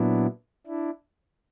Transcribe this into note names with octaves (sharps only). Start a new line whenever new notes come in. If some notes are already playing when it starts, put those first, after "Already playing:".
Already playing: A#2 F#3 B3 D4 E4
D4 E4